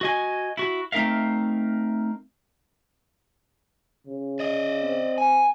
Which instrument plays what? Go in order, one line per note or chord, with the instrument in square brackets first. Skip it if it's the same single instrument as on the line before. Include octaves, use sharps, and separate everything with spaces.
[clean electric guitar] F#4 D#5 G#5
E4 F#4
A3 C4 D#4 A#4 E5 F5
[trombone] C#3
[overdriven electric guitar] D5 D#5
[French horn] C4
[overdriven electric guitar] G#5